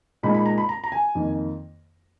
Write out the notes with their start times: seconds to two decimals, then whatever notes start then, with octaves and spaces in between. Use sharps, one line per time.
0.23 A#2 G#3 D#4 B5
0.34 B5
0.46 A#5
0.58 B5
0.69 A#5
0.84 A#5
0.92 G#5
1.15 F2 D#3 A#3 D#4